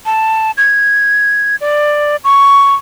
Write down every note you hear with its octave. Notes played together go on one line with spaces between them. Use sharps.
A5
G#6
D5
C#6